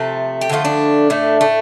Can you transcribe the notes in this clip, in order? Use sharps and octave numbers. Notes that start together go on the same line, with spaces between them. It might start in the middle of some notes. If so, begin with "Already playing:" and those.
Already playing: C3 F3 A3
G4
D3 F3 A3 F4
D4
A2 A3
A3